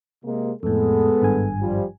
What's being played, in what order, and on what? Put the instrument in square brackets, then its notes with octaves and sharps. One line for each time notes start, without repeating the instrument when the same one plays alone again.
[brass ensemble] C3 G#3 A#3
[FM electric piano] F2 A2 [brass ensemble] G#3 B3 A4
[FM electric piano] G#1 G2 G#5
[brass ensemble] F3 G3